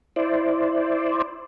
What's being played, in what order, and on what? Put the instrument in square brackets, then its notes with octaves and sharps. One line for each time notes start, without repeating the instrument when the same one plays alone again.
[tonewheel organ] E4 C5 D5